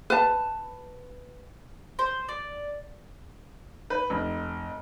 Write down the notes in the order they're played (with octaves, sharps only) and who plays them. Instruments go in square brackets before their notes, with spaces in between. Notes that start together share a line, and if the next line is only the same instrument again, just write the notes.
[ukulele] B4 A5
[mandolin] C5
D5
[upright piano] B4
F1